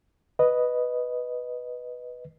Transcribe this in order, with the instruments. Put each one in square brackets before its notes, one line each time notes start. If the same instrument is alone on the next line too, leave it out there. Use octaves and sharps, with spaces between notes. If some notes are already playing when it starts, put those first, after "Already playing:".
[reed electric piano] B4 D#5